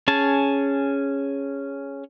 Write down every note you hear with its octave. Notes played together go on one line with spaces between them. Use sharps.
C#4 G#4 A5